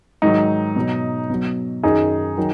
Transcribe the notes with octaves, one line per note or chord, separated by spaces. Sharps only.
G#2 D#3 F#3 D#4
B2 F#3
B2 F#3
F#2 D#3 F#3 D#4 G#4
D#3 F#3